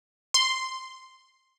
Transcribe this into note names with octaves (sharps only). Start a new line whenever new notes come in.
C6